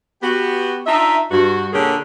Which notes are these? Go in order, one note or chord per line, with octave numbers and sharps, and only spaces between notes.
B3 F#4 G4
D4 D#4 F4 E5
G2 F#4
A#2 D3 C#4 G4 G#4 A#4